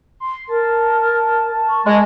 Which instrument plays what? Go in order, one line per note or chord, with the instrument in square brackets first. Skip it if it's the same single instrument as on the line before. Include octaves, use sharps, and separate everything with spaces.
[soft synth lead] C6
[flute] A#4 [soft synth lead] A5
[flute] C#6
[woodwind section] G#3 [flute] G#5